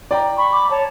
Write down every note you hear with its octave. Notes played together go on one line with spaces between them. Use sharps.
D5 G5 A#5
B5 C#6
D6
C#5 A5